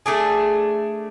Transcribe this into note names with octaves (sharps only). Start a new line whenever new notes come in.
A3 D4 G#4